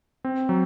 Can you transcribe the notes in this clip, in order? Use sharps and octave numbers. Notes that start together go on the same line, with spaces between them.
C4
F#3